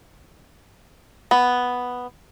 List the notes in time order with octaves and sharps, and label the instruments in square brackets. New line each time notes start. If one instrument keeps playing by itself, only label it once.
[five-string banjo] B3